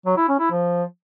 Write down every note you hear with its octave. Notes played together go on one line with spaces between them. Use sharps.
F#3
E4
C#4
E4
F3